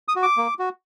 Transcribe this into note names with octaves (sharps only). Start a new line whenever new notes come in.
D#6
F#4
D6
A#3
F#4